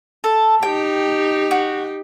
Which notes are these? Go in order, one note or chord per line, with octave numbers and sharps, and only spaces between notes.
A4
D#4 G4 G5
F#4